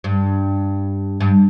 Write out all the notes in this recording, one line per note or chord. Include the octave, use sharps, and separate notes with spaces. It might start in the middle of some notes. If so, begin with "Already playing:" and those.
G2
G2